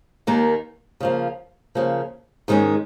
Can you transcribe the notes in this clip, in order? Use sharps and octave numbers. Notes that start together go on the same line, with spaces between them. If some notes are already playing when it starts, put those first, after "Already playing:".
D#2 D#3 A#3
C#3 F3 A#3
C#3 F3 A#3
G#2 D#3 G#3 C#4